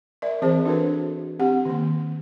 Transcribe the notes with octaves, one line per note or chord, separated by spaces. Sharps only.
A#4 D5 E5
E3 C4 G#4 C5 A5
D4 F#4 A4 B4
C4 G4 F#5
D#3 A#3